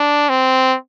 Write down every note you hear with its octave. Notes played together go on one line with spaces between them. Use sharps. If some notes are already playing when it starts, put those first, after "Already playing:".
Already playing: D4
C4